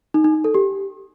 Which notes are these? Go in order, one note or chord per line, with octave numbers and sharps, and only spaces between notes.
D#4
D#4
D#4
A4
G4